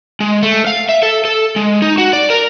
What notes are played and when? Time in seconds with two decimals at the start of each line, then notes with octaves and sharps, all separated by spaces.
0.20 G#3
0.43 A3
0.67 F5
0.89 E5
1.03 A4
1.25 A4
1.56 G#3
1.82 D#4
1.98 F#4
2.13 D5
2.30 A#4